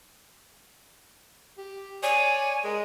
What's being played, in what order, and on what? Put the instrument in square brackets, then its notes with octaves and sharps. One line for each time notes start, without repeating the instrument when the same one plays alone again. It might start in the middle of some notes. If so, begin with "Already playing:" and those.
[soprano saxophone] G4
[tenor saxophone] C#5 [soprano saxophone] D5 [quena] G#5
[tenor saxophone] G#3 [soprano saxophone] A#4